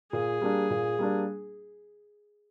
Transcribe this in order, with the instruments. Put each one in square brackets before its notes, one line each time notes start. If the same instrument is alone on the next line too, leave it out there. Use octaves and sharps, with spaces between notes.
[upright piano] A#2 [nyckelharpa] G#4
[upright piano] G3 A#3 D4
A#2
G3 A#3 D4